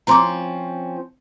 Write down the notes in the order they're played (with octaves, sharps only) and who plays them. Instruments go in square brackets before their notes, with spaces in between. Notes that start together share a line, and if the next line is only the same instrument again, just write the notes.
[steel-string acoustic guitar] F3 C4 C#4 [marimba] A#5 C6 D6